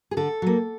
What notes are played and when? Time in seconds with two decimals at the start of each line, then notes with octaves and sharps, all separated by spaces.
0.11 G#4
0.17 D3 A4
0.42 F#3 A#3